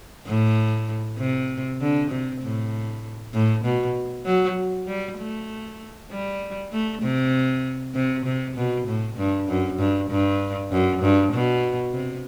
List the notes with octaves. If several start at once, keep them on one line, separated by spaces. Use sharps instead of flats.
A2
C3
D3
C3
A2
A2
B2
F#3
G3
A3
G3
A3
C3
C3
C3
B2
A2
G2
F#2
G2
G2
F#2
G2
B2
C3